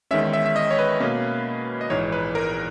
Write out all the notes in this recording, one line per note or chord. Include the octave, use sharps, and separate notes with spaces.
E2 D#3 G#3 C#4 E5
E5
E5
D#5
C#5
B4
B2 A#3 C#4
D#5
A#1 G#2 E3 C#5
B4
A#4